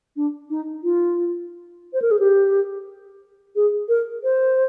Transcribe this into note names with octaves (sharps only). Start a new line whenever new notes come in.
D4
D#4
F4
C5
A#4
G#4
G4
G#4
A#4
C5